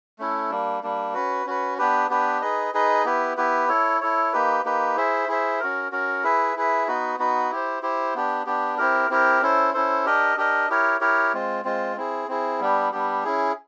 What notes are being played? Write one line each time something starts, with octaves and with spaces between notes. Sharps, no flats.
A3 C#4 E4 A4
G3 A#3 D4
G3 A#3 D4
C#4 F#4 B4
C#4 F#4 B4
B3 D4 G4 B4
B3 D4 G4 B4
D#4 G#4 B4 D#5
D#4 G#4 B4 D#5
B3 E4 G4 B4
B3 E4 G4 B4
E4 A4 C#5
E4 A4 C#5
A#3 D#4 G4 B4
A#3 D#4 G4 B4
E4 G#4 C5 E5
E4 G#4 C5 E5
C#4 F#4 A#4
C#4 F#4 A#4
E4 G#4 B4 E5
E4 G#4 B4 E5
B3 D#4 F#4 B4
B3 D#4 F#4 B4
E4 G4 C5
E4 G4 C5
B3 D4 G4
B3 D4 G4
C4 E4 G4 A#4
C4 E4 G4 A#4
C#4 E4 A4 C5
C#4 E4 A4 C5
D4 G4 A#4 D#5
D4 G4 A#4 D#5
E4 G4 A#4 C#5
E4 G4 A#4 C#5
G#3 C4 F4
G#3 C4 F4
C4 E4 G#4
C4 E4 G#4
G3 B3 D4 G4
G3 B3 D4 G4
C#4 E4 G#4